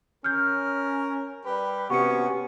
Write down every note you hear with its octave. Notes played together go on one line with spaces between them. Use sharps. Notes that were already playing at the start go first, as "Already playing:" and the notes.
C#4 A#4 F6 G6
G3 G4 B4
C3 B3 C#4 F#4 G#4 C#6 C#7